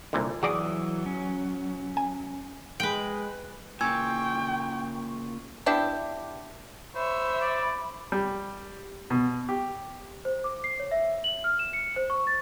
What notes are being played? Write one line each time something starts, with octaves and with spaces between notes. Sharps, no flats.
C2 A#2 D3
E3 F#3 F#4 G#4 D5 D#6
C#4
G#5
G#3 B4 G5
A#2 C#3 A#3 G5 G#5 C#6 E6 G#6
B3 D4 E4 G4
C5 C#5 E5 B5
D5
G3
B2
G4
C5
D6
C7
C#5
E5
F#7
F6
E7
C#7
C5
C#6
A6